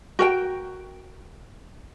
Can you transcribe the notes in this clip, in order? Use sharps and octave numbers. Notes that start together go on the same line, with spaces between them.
F#4 A#4 G5